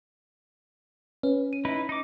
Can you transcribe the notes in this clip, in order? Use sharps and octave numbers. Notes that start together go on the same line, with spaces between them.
C#4 B4
D#7
D#4 E4 B4
D#4 D6